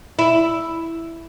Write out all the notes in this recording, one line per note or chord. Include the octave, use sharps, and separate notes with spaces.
E4